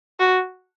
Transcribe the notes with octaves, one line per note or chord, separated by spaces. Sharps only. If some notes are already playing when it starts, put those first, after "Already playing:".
F#4